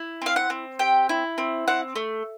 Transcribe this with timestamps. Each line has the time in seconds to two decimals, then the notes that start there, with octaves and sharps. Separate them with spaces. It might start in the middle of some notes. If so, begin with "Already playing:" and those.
Already playing: E4
0.22 C4 F5
0.36 F#5
0.50 C4
0.79 G4 G5
1.09 E4
1.38 C4
1.68 C4 F#5
1.96 A3